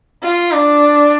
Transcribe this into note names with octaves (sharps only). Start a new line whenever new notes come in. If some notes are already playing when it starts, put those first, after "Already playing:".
F4
D4